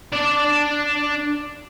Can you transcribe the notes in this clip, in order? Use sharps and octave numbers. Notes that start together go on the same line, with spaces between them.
D4 D5